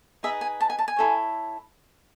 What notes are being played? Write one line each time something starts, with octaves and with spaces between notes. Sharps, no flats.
D#4 G#4 B4 D#5 E5
G#5
A5
G#5
A5
G#5
E4 A4 C#5